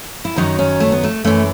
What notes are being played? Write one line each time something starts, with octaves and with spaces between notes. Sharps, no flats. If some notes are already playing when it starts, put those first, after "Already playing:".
E4
F#2 D#3 F#3 D#4
C#4
A3
B3
A3
F#2 E3 A3